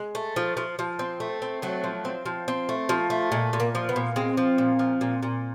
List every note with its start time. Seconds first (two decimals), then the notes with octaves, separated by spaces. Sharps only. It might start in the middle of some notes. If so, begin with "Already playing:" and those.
Already playing: G#3
0.15 A3
0.36 F3
0.57 F3
0.79 F3
0.99 C4
1.20 A3
1.42 C4
1.62 F#3 A3
1.84 F3
2.05 C4
2.26 F3
2.48 C4
2.69 A3
2.89 F3
3.10 A3
3.32 A#2 G#3
3.53 A#2
3.60 A#3
3.75 F3
3.89 B3
3.96 A#2
4.16 G#3 C4
4.37 F3
4.58 A#2
4.79 F3
5.01 A#2
5.23 A#2